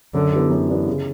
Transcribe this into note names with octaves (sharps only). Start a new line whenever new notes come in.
F#2 D3
E3 B3 D4 G4
F#2
E3 B3 D4 G4
C#3